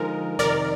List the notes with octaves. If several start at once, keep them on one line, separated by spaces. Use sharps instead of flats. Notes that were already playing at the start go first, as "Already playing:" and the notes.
Already playing: D3 F3 G#3 D#4 A#4
F2 C3 D#3 A#4 D5